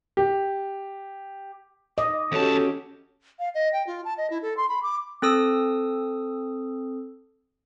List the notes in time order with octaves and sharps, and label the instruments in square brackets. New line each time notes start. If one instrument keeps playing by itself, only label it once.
[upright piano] G4
[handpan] D#5 [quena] D6
[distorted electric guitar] E2 A5 [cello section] C#4 F#4 G4 [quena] A4
[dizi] F5
D#5
G5
F4
A5
D#5
E4
A4
C6
B5
D6
[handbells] C4 A4 D#6 E6